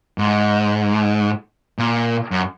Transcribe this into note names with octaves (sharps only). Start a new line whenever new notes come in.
G#2
A#2
F#2